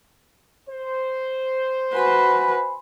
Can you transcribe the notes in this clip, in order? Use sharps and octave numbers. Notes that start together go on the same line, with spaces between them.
C5
F#4 B4 G#5 B5 C6